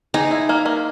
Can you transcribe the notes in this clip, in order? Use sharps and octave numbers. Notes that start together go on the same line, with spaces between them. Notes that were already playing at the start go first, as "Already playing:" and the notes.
D#4 G#4
E4
A#3
A#3